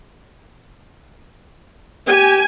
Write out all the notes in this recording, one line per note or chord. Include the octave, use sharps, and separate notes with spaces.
G4 G#5